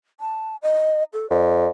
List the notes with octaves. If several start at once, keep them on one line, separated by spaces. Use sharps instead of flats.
A5
D#5
A4
F2 D5